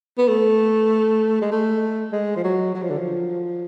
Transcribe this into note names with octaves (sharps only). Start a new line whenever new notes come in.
B3
A3
G#3
A3
G#3
F3
F#3
F#3
F3
D3
F3